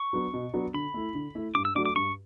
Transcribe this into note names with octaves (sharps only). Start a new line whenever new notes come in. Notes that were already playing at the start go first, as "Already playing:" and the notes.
Already playing: C#6
F#3 B3 D4 F#4
B2
F#3 B3 D4 F#4
D3 B5
A3 E4
D3
A3 E4
G2 D6
E6
F#3 A3 D4 F#4 D6
D6
G2 C#6